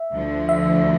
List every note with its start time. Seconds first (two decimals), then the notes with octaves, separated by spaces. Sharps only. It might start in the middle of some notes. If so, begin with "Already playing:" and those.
Already playing: E5
0.12 D2 D3 F3
0.49 E5